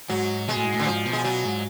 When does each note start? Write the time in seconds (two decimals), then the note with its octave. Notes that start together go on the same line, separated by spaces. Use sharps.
0.09 G#2 F#3
0.48 B2 G#3
0.56 A2
0.64 G#2
0.73 A2
0.80 D3
0.86 G#2 F3
1.06 B2
1.13 G#3
1.24 B2 F#3
1.44 G#2